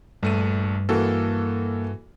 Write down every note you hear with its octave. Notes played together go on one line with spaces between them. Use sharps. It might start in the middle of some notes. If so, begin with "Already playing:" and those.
A#1 G2 A3 D#7
E3 A#3 F#4 A4